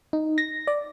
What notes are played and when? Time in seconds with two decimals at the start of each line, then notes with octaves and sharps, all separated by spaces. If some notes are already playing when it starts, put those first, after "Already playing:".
0.13 D#4
0.38 A#6
0.67 D5